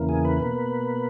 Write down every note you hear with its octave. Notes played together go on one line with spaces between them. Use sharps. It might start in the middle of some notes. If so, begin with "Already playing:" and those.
Already playing: E2 C#3 E3 A#3
G#4
B4
B2 A#3